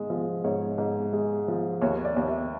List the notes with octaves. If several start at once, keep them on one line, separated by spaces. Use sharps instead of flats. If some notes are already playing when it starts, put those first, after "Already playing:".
Already playing: G#2 G#3
F3
G#2 C#5
G#2
G#3
F3
D#2 C#5
D5
D#2
E5